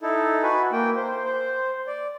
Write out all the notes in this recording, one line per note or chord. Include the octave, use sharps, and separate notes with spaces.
D#4 E4 A4
F#4 B4 G#5
A#3 G5
C5
C5
D5